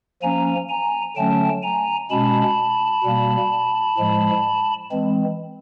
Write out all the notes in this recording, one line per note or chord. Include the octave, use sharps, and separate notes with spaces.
F3 A#3 C#4 G#5 A#5
G#5 A#5
D3 F#3 A3 C#4 G5 A5
G#5 A#5
B2 G#3 C#4 A5 B5
B2 G3 A#3
A2 F3 G#3
E3 G#3 C4